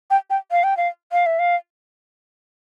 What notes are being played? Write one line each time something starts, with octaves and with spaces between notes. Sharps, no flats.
G5
G5
F5
G5
F5
F5
E5
F5